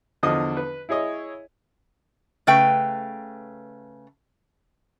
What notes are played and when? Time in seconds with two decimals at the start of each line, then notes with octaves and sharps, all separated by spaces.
0.23 E2 D3 F3 D#5 D#6
0.57 B4
0.89 E4 G#4 C#5 D#5
2.47 C#3 A3 B4 G5